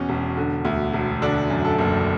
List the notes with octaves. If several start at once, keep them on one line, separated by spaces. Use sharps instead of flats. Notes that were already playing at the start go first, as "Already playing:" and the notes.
Already playing: E2 B2 C#4
E1
D3
D2
E1
D3 D4
F#2
A4
F#1